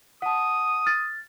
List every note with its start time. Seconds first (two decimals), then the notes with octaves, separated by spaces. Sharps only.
0.22 F#5 A5 D#6
0.86 F6 A6